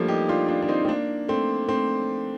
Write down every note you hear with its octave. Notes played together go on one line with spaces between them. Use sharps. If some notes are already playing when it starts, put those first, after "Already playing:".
Already playing: F3 G3 A3 A#3 D4 F4
D#4 G4
D4 F4
D4 F4
D4
C4 D#4
C4
A#3 D4
A3 C4
A3 C4